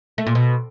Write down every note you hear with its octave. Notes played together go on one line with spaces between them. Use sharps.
A3
A#2
B2